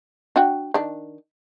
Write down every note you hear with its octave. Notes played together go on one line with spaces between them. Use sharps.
D4 F#4 G5
D#3 D4